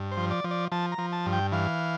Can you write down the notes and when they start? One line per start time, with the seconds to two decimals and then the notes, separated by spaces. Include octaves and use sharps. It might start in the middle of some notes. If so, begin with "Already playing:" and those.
Already playing: G2
0.11 C5
0.17 F3
0.31 D5
0.44 F3
0.51 D5
0.72 F3 A5
0.92 A#5
0.98 F3
1.12 A5
1.26 G2
1.33 G5
1.52 E3 F5